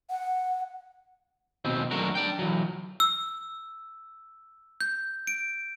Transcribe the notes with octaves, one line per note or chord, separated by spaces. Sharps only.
F#5
D#2 B2 C4
D#2 F#3 A3 D4 F#4 A#4
D4 D5 G5
E3 F#3
E6
G6
D7